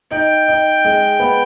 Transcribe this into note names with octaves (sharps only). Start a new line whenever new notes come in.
D#4 G5
D#4
G#3
B3